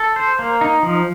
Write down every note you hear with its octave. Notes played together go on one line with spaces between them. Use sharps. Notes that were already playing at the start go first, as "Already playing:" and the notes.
Already playing: A4
C5
A#3
D#4
F3